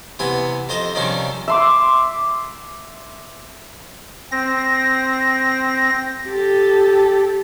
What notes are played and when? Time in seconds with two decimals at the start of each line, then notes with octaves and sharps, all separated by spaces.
0.19 C3 E3 B3 G#5
0.69 F2 F4 C5 D#5
0.95 C3 D#3 F3 G3 C#4 D4
1.48 E5 C6 D6
4.32 C4 A#6
6.27 G4 A4